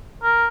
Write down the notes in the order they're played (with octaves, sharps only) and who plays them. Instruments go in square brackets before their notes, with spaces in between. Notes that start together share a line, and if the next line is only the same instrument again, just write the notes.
[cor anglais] A#4